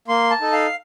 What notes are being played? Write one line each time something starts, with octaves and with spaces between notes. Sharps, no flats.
A#3 C6
A5
D#4 A4
F5